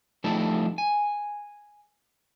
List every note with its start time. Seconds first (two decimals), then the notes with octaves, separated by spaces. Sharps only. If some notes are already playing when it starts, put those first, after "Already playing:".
0.24 F3 G3 A3 D#4 E4 A4
0.78 G#5